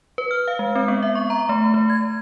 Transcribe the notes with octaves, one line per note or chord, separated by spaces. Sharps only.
B4
F6
F5
G#3
C4
B3
E5
C#6
A#5
A3
A3
G#6